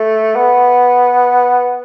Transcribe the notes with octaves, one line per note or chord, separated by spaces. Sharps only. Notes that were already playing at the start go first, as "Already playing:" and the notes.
Already playing: A3
B3